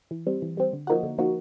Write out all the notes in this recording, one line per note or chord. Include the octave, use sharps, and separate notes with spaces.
E3
G3 C4
E3
G3 C4
D3
F3 A#3 D#4 F#4
D3
F3 A#3 D#4 F#4